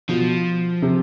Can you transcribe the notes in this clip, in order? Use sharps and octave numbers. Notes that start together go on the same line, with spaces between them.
B2 F3
C3